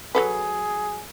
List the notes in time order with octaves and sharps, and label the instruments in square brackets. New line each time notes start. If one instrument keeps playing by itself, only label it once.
[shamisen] F#3 A4 B4 [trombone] G#4